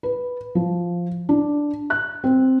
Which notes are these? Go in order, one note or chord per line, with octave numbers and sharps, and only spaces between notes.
B4
F3
D4
F#6
C4